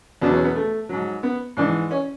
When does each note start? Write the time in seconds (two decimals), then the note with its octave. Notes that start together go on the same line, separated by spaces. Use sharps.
0.22 E2 B2 F#3 D4
0.33 C#4
0.45 B3
0.56 A3
0.89 G#2 F#3
1.23 B3
1.57 G#2 E3 D4
1.91 C#4